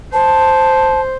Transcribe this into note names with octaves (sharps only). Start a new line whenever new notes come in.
C5 A5